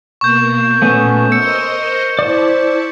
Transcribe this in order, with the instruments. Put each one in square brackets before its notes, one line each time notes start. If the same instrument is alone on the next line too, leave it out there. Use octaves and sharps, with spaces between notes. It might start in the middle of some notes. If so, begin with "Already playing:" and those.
[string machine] B2 A#3 [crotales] C#6 G6
[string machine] A#2 [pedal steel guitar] A3 B3 C#4
[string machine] A#4 C5 D#5 [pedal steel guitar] E6 [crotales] C#7
[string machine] E4 A5 [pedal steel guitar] C5 D5